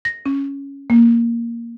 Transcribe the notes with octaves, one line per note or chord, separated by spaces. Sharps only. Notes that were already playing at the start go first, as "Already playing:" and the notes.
A#6
C#4
A#3